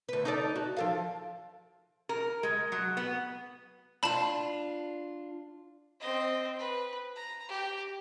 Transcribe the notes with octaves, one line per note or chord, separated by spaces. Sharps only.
D2 B4
D#4 A4 D5
F#4
F3 A4 F5
A#4
G#3
F#3
B3
D4 F4 A5 B5
C4 D#5
B4
A#5
G4